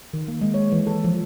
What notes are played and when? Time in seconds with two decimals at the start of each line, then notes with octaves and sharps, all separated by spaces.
0.14 D#3
0.28 A#3
0.42 G#3
0.54 C#5
0.72 E3
0.87 A4
1.05 F3